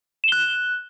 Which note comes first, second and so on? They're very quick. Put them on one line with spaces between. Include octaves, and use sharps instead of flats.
E7 G7 F#6